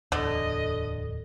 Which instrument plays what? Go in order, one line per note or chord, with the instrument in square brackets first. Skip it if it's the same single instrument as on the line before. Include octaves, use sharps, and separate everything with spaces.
[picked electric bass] D1 E2 [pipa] D3 [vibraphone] A4 [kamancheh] D#5